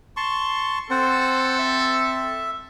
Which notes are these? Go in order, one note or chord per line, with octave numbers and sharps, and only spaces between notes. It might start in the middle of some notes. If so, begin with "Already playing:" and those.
A5 C6 C#6
C4 A4 C5 F#5
E5